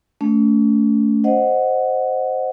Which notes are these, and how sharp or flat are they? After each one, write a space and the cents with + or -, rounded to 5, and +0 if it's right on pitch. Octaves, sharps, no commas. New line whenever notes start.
A3 +0 C#4 +40
C5 +0 D#5 -10 F#5 +0